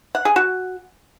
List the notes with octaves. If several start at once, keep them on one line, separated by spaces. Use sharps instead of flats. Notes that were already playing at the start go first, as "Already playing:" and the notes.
F#5
G#4
F#4